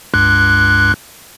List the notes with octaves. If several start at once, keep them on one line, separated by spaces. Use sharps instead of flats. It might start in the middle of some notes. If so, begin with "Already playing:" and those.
C#2 G2 F#6